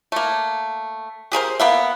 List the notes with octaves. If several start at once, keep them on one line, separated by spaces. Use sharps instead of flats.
A3 A#3
G4 G#4 A#4 C5
A#3 B3 E5